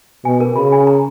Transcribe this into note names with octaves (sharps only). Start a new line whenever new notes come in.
B2 G#5
A#4
C#3 B5
G#5
A#5